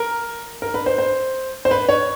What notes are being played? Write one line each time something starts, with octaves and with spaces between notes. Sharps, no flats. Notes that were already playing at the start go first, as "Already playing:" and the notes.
Already playing: A#4
A#4
B4
C5
C5
C5
B4
C#5